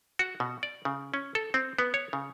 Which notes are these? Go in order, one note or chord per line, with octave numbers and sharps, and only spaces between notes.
F#4
B2
D5
C#3
C#4
A4
C4
B3
C#5
C#3